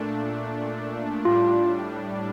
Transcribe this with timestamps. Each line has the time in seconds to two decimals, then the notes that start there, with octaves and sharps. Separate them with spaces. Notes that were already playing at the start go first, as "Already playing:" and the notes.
Already playing: A#2 A3 D4
1.25 A2 G3 D4 F4